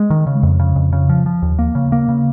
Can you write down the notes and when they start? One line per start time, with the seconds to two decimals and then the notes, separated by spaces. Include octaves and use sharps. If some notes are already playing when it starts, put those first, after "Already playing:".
Already playing: G#3
0.10 D#3
0.27 C#3
0.43 F2
0.59 C#3
0.76 F2
0.93 C#3
1.09 F3
1.26 F3
1.42 D#2
1.59 A#3
1.75 C#3
1.92 A#3
2.09 C#3